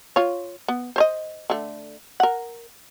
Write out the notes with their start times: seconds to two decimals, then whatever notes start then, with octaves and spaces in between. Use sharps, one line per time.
0.16 F4 C#5
0.68 B3
0.96 C5 C#5 D#5
1.50 D3 A3
2.20 A#4 F#5